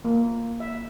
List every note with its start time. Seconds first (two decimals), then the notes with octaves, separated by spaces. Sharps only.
0.05 A#3
0.60 E5